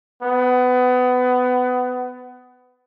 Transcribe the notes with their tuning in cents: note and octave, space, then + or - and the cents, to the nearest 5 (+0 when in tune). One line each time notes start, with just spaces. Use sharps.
B3 +25